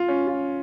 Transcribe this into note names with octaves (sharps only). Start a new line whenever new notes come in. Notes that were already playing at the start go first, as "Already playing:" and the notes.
Already playing: F4
C#4
F4